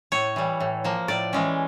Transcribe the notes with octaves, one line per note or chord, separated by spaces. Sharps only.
A2 C#5
E3 G3
A2
F3 A#3
A2 D5
E3 G#3 C#4